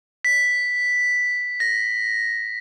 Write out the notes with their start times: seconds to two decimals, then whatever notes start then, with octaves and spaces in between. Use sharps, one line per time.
0.25 B6
1.60 A#6